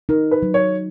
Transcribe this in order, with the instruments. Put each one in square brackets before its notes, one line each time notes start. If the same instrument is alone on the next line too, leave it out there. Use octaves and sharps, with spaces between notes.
[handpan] D#4 [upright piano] A#4
[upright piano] B4
[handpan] F#3
[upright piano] C#5